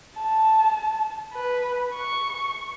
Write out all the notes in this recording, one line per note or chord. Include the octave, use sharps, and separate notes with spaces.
A5
B4
C#6